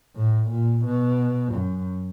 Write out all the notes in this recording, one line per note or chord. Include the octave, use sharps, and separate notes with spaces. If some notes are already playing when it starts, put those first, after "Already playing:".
A2
A#2
B2
F#2